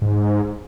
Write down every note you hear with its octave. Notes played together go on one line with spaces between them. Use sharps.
G#2